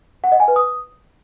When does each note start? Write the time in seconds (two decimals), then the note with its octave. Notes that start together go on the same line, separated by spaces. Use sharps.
0.24 F#5
0.32 D#5
0.40 G#5
0.48 B4
0.56 D#6